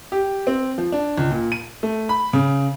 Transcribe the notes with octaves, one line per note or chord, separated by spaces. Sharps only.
G4
C4
F3
D4
C#2
A#2
D#7
A3
B5
C#3